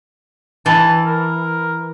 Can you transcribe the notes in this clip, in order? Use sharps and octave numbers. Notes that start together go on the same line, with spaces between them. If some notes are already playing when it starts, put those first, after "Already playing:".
E3 A5
A#4